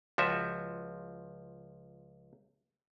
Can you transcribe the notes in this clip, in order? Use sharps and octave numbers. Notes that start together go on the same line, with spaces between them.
C#2 F3 F#4 E5